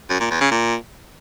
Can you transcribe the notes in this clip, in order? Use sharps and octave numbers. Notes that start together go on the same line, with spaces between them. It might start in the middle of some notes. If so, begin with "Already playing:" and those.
F#2
A#2
E2
C#3
A#2